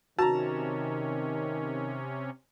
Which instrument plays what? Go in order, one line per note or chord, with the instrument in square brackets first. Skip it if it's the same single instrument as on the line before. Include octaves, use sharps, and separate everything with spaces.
[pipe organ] C3 C#4 [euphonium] D#3 [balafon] F#4 [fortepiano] A5 A#5